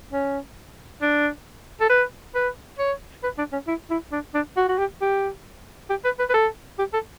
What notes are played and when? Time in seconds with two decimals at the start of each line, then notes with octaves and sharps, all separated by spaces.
0.12 C#4
1.02 D4
1.81 A4
1.90 B4
2.35 B4
2.78 C#5
3.23 B4
3.38 D4
3.52 C#4
3.67 E4
3.90 E4
4.12 D4
4.34 D4
4.57 F#4
4.68 F#4
4.78 G4
5.01 G4
5.90 G4
6.04 B4
6.19 B4
6.29 B4
6.34 A4
6.78 G4
6.93 A4